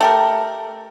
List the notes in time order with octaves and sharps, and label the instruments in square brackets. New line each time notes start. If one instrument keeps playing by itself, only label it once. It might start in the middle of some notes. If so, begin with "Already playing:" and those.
[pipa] A3 G4 A#4